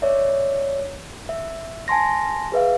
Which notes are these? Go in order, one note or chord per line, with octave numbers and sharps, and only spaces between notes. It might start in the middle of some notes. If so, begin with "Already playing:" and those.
C#5 D5 E5
E5
G#5 A5 C6 A#6
G#4 B4 E5 F5